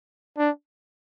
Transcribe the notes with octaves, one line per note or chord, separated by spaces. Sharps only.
D4